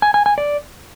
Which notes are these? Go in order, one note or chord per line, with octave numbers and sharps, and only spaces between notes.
G#5
G#5
G#5
D5